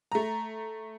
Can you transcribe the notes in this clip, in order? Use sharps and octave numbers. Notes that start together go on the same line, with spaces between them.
A3 A#5